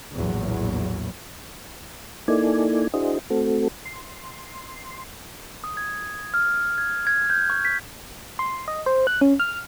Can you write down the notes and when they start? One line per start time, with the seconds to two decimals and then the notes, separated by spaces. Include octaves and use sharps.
0.13 A#1 E2 A2 F#3
2.28 A#3 D#4 E4 A4 D5 G#5
2.94 D4 E4 F#4 G#4 C5 D#5
3.30 A3 C4 F#4 A4
3.85 C6
5.64 D#6
5.77 G#6
6.34 F6
6.78 G#6
7.07 G#6
7.30 G6
7.50 C#6
7.65 B6
8.39 C6
8.68 D#5
8.86 C5
9.07 F#6
9.21 C#4
9.40 F6